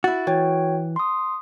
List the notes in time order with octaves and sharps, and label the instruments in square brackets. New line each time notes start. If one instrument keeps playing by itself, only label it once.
[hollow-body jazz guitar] E4 F#4 [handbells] A6
[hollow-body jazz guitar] E3 [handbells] F#4 C#5 G5
[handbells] C6 D#6